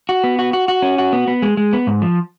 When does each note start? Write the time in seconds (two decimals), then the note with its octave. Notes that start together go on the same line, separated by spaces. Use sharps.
0.09 F#4
0.24 B3
0.39 F#4
0.53 F#4
0.68 F#4
0.82 C#4
0.98 F#4
1.13 B3
1.28 B3
1.42 G#3
1.57 G#3
1.73 B3
1.87 G#2
2.02 F3